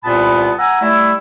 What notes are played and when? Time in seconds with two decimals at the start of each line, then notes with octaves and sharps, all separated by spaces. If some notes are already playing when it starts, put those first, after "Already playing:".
0.04 C2 A#2 B3 A5 B5
0.58 F#5 G#5 A#5 E6
0.80 G3 A3 E4